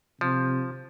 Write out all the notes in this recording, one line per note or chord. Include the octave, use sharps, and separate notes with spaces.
C3 F3